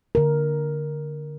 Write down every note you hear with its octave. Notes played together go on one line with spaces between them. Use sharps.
D3 A#4